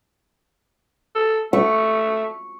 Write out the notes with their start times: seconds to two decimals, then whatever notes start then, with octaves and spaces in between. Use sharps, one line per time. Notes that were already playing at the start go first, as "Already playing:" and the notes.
1.16 A4
1.53 A3 C#6